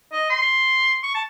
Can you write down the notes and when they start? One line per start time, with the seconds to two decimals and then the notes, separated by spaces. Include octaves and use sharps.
0.12 D#5
0.30 C6
1.03 C#6
1.15 A5